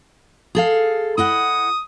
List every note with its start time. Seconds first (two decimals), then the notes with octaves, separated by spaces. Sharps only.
0.55 G#4 A4 F5
1.18 E4 D#5 F#5 D#6